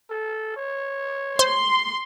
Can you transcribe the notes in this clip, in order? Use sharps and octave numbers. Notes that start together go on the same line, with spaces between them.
A4
C#5
C5 C6